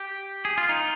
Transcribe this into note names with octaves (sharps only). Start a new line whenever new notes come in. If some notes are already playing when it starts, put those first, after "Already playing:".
Already playing: G4
G#4
F4
D#4